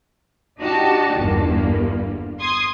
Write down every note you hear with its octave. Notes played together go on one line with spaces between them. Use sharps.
D4 D#4 F#4 G4 A5
G1 E2 G2 A#3
C6 D#6 G#6